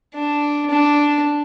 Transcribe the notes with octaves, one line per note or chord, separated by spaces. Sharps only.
D4
D4